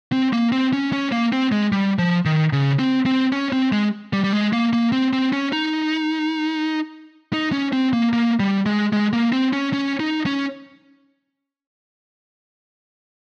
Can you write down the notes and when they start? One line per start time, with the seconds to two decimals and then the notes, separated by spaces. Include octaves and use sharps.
0.12 C4
0.33 A#3
0.52 C4
0.73 C#4
0.93 C#4
1.12 A#3
1.33 C4
1.52 G#3
1.72 G3
1.99 F3
2.25 D#3
2.53 C#3
2.79 C4
3.06 C4
3.32 C#4
3.53 C4
3.72 G#3
4.13 G3
4.24 G3
4.33 G#3
4.53 A#3
4.73 A#3
4.92 C4
5.13 C4
5.33 C#4
5.53 D#4
7.33 D#4
7.52 C#4
7.73 C4
7.93 A#3
8.13 A#3
8.40 G3
8.66 G#3
8.93 G#3
9.13 A#3
9.32 C4
9.53 C#4
9.73 C#4
10.00 D#4
10.26 C#4